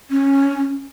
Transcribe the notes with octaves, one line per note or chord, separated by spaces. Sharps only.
C#4